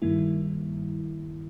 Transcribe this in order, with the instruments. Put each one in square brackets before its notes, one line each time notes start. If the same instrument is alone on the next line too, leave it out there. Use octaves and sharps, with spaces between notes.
[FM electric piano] G2 D#3 G3 A#3 E4